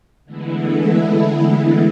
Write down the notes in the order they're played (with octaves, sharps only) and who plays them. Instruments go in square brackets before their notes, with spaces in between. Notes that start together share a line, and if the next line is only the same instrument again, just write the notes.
[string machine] D3 E3 G#3 A3 B3 E4